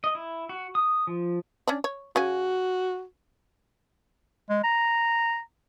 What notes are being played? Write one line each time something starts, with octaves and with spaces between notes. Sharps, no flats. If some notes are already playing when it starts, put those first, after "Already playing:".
D#5
E4
F#4
D#6
F3
C#4 D4 D5
C#5
C#3 C#4 F#4 G#5
G#3
A#5